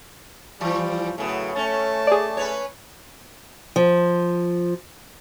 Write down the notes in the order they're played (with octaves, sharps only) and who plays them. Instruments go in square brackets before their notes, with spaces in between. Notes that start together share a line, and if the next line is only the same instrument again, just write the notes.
[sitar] E3 [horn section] F3 G3
[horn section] A2 F#3 A3 [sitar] C#3 B3
[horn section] A3 A5 [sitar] C#4
[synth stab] G#4 D5
[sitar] C#4 B4 C#5
[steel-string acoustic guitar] F3